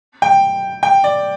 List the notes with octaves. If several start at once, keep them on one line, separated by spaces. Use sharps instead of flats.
G5
G5
D5